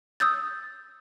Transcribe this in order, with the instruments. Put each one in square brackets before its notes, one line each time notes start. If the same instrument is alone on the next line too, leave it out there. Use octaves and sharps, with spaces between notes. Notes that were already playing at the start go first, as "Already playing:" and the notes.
[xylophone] D#6 E6 G6 A6